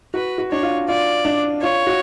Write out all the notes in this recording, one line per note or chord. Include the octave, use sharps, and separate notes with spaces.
F#4 B4
F#4
D4 C#5
F4
F4 D5
D4
F4 C#5
F#4